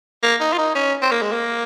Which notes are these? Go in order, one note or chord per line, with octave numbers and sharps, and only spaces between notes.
A#3
D#4
F4
D#4
C#4
C4
A#3
G#3
A#3